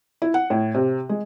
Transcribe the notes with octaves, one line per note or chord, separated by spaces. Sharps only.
E4
F#5
A2
C3
G#3